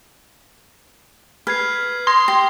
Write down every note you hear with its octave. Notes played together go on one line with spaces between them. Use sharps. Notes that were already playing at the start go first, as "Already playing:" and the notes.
B4 F6 G#6 C7
C6 D#6 G#6 A#6
G4 G7